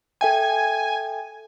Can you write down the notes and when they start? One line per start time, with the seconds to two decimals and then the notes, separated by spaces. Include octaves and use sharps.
0.21 A4 E5 G5 G#5